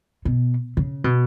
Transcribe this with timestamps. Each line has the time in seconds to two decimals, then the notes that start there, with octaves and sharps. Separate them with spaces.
0.25 B2
0.77 C#3
1.04 B2